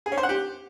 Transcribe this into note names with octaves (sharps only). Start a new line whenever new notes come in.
G#4
C#4
C5
F#5
G4